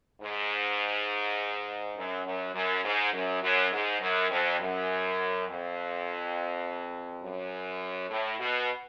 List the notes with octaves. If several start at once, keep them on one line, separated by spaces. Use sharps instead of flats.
G#2
F#2
F#2
F#2
G#2
F#2
F#2
G#2
F#2
F2
F#2
F2
F#2
A2
B2